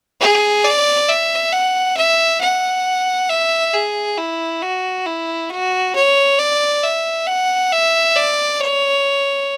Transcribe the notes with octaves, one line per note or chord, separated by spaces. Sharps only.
G#4
D5
E5
F#5
E5
F#5
E5
G#4
E4
F#4
E4
F#4
C#5
D5
E5
F#5
E5
D5
C#5